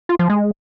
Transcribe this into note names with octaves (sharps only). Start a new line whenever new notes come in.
F4
F3
G#3